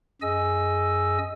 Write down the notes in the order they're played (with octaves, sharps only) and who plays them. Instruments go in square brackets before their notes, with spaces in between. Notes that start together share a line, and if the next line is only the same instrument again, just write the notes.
[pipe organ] F#2 G#4 D#5 G#5 E6